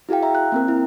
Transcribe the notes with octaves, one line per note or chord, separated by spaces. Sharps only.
E4 F#4 G#4 F5 G5
E5 G5 A#5
F#6
A#3 C4 A#4
E4